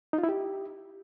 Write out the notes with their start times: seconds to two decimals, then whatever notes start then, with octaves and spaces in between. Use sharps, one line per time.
0.13 D#4
0.18 F4
0.23 E4
0.29 G4